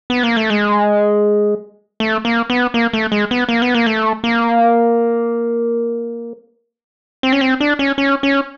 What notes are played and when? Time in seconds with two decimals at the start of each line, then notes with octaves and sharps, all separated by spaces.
0.10 B3
0.23 A#3
0.37 A3
0.50 G#3
2.00 A3
2.25 A#3
2.50 B3
2.74 A#3
2.93 A3
3.12 G#3
3.31 B3
3.49 A#3
3.62 B3
3.74 A#3
3.87 A3
4.24 A#3
7.23 C4
7.33 C#4
7.41 C4
7.60 D4
7.79 C#4
7.98 C#4
8.23 C#4